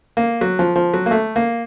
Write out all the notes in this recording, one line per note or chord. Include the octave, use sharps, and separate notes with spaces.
A#3
F#3
F3
F3
F#3
A#3
A3
A#3